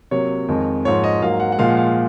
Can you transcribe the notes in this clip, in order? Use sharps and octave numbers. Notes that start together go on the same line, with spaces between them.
C3 F#3 A#3 C#5
F2 D#3 G#3
G#2 F3 A#3 C#5
D#5
G#2 F#3 A#3 F5
F#5
F#5
A#2 F3 G#3 F5
F#5
F5